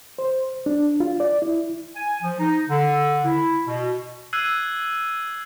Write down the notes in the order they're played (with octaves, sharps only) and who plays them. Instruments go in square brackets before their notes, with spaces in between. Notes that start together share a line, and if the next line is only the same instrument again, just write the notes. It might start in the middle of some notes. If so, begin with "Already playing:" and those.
[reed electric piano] C5
D4
F4
D5
E4
[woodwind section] G#5
F3
D#4
D3
E4
B2
[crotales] E6 F#6 G#6 C7 D#7